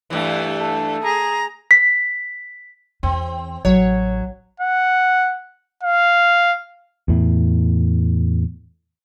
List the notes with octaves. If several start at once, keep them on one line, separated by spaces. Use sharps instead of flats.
G2 E3 A3
A4
G#4 A#5
B6
E2 C4
A1 F#3 C#5
F#5
F5
E2 A2